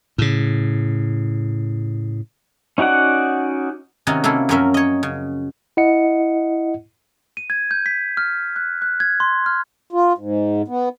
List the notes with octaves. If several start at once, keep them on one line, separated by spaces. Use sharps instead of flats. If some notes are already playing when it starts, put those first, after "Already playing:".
A2 C#3
C#4 D#4 F#4 D5 F#5
C3 D#3 C#4 D#4 F#4
C3 A#3 C#4 E4 A4
F#2 F3 F#3 C#4 A#4 E5
C#5 D#5
C#3
E4 D#5 F#5 C#7
D#7
G#6
G6
B6
F6
F#6
F#6
G#6
C6
F6
F4
G#2
B3